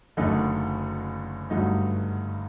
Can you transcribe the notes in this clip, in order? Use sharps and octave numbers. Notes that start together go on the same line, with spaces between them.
F#1 F#2 D3 A3 D#4
G1 G2 F#3 A3 D#4